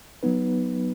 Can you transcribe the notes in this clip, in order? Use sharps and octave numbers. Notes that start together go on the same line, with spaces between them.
F#3 B3 D#4 B4